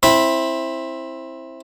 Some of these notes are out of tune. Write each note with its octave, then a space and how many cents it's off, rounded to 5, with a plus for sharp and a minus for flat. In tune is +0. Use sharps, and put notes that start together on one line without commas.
C4 +20 E4 +0 B5 +0